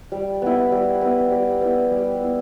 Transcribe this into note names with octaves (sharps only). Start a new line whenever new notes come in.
G3
B3 E4
G3
B3 E4
G3
B3 E4
G3
B3 E4